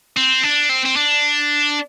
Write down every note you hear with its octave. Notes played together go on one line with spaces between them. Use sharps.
C4
D4
C4
C4
D4